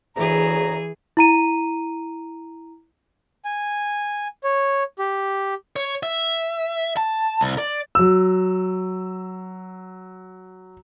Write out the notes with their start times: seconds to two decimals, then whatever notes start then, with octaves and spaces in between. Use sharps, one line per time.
0.16 D2 C#3 E3 G#4 A#5
1.17 E4 A#5 D#7
3.45 G#5
4.44 C#5
4.99 G4
5.76 C#5
6.03 E5
6.97 A5
7.41 C2
7.58 D5
7.95 F#3 E6